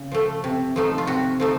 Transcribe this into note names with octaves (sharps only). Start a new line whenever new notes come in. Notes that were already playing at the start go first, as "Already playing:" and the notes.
Already playing: C#3
F3 A3
C3
F3 A3 D#4
F4
C3 F#4
F3 A3 D#4